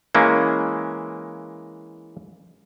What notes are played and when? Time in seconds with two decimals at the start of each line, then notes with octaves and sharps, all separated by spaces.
0.15 E3 G#3 A#3 C#4